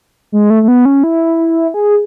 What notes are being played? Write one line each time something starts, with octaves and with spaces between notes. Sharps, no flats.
G#3
A3
A3
B3
C#4
E4
G#4